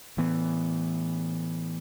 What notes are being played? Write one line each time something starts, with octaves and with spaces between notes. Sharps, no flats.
A2 E3 B3